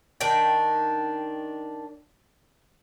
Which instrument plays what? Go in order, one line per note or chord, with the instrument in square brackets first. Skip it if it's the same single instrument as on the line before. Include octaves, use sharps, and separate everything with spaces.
[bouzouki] D#3 D4 G5